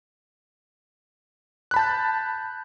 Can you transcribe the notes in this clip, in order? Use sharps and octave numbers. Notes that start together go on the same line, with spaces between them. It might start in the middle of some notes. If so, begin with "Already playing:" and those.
A5 B5 F#6 G6